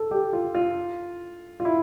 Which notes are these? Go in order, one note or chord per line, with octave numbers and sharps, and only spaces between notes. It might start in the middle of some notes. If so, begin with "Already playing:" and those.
Already playing: A4
G4
F4
F4
F4
E4